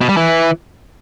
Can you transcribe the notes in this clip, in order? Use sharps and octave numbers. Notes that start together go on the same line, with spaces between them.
B2
G3
E3